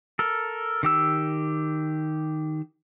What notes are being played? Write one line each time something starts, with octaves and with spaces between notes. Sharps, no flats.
A4 A#4
D#3 G4 E6